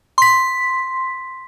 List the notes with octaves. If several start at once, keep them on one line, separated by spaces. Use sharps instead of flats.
C6 B6